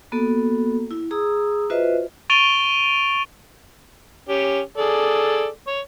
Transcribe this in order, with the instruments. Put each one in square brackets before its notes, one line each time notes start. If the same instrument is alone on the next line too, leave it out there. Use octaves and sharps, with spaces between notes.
[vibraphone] A#3 B3 F#4 A4
E4
G#4 A#5 D#6 E6
F4 F#4 B4 C5 D#5 E5
[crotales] C#6 A6 D7 D#7 F7 G7
[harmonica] C#4 G4
G#4 A4 D5
C#5